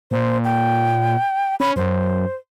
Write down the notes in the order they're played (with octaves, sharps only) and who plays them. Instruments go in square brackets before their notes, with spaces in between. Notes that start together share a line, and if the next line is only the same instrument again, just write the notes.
[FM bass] A#2 [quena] C5
[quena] G5
[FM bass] C#4 [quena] B5
[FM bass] F#2 [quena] C5